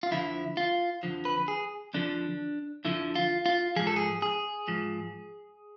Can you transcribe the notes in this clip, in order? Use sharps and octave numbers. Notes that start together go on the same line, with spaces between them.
F4
F2 D3 F3 E4
F4
F2 D3 F3
B4
G#4
F2 D3 F3 D4
F2 D3 F3 E4
F4
F4
G#2 F3 G#4
A4
G#4
G#4
G#2 F3